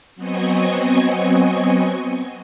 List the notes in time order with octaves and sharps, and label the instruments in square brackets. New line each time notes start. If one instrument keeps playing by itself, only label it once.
[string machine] F#3 B3 C4 D#5 G#5 C#6